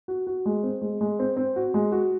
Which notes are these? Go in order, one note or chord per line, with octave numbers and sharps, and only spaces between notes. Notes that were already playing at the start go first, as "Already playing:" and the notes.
F#4
F#4
G#3
C4
G#3
G#3
C4
C4
F#4
G#3
F#4